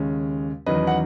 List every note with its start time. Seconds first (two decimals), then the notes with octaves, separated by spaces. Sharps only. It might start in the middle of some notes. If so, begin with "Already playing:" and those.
Already playing: D#2 C#3 G#3 C#4
0.66 E2 D#3 F#3 C#4 B4 D#5
0.87 F#5